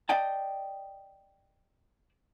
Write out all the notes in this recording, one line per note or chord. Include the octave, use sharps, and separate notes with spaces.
D5 D#5 G5 A5